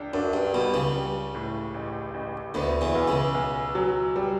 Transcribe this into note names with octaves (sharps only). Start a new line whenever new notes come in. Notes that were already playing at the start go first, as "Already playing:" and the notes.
Already playing: C#2 D4
F#2 D4
G2
B1 B2 G3
C#2 C#3
G3
A2
A1
A1
D2 D3 B3
E2 E3
B1
C#2 C#3
B1
F#3
G3